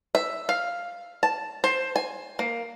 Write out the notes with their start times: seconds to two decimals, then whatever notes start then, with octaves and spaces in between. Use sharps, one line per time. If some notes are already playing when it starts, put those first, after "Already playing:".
0.15 E5
0.49 F5
1.23 A5
1.64 C5
1.96 G#5
2.39 A#3